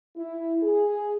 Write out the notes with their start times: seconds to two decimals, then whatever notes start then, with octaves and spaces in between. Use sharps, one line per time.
0.17 E4
0.63 G#4